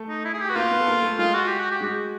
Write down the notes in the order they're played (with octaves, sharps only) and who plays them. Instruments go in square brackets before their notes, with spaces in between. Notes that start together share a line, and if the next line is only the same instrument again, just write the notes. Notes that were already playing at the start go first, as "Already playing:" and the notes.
Already playing: [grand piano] A3 A4
[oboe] D#4
E4
G#4
G4
[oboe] F#4 [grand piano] B4
[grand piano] A#3 A#4 [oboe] F4
[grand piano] B3 B4
A4
A#3 A#4
A3 A4
[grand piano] G#3 G#4 [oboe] F4
[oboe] F#4
G4
F#4
G4
[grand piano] G#3 G#4 [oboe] F#4